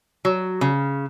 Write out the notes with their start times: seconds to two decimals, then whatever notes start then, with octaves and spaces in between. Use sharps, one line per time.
0.25 F#3
0.61 C#3